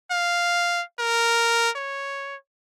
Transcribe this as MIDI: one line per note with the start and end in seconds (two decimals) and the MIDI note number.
0.11 0.82 77
0.99 1.70 70
1.76 2.36 73